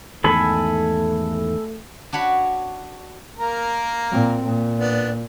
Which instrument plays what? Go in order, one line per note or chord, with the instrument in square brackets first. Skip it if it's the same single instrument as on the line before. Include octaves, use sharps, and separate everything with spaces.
[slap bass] E2 G#2 D#3 [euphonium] A3 [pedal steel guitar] A4 G#5 B5
[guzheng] D4 F#4 C#5 B5
[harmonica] A#3 A#4 A#5
[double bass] A#2 C4
A#2
[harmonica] B3 D4